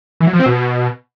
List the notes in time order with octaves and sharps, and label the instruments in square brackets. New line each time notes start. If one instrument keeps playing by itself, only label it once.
[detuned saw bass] E3
F#3
F3
C4
B2